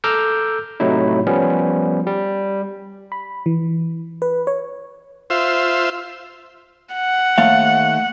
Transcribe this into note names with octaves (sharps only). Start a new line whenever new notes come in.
A4 A#5 D6 E6 F6 G6
A2 C3 F#3 D#4 E4
F3 G3 B3 C#4
G3
B5
E3
B4
C#5
F4 C5 E5
F#5
D#2 A3 F5